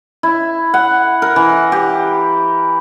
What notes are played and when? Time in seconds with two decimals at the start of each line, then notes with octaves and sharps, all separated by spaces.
0.23 E4
0.74 F#5
1.22 A#4
1.36 E3
1.72 G4